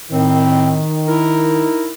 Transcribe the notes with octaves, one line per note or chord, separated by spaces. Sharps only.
A2 D#3 C4
D#4 E4 A#4